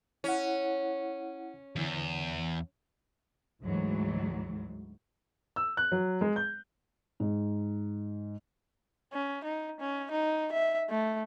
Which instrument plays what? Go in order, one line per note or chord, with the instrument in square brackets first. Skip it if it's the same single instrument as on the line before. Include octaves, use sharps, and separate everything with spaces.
[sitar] C#4 [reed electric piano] E4 F#5
[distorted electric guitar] E2 [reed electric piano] D3 E3
[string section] D2 G#2 E3 F#3
[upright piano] E6
F#6
F#3
G#3
G6
[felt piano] G#2
[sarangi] C#4
D#4
C#4
D#4
E5
A3